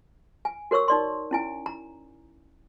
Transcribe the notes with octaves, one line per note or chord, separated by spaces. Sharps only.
G#5
F#4 A#4 C#5 C#6 E6
D#4 D5 C6
C#4 E4 G#5
A#5